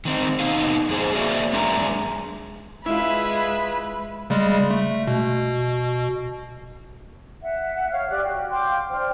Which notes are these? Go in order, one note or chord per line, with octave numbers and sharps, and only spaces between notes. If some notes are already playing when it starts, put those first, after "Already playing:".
D#3 C4 D#4
B2 D#4 D#5 F5
F2 G#4 C5
A#3 F#4 C#5 D5 E5
F#2 G#3 D4 G#4 E5 A#5
G#3 E4 F4 B4 E5
C#3 G3 G#3
A3
B2
E5 F#5
C#5 F5 F6
G4 D5 F#6
F#4 G5
F5 G5 C6 D6
D4 C5 G5 F6